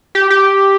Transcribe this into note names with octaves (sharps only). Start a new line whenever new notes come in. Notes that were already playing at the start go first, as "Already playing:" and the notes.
G4
G4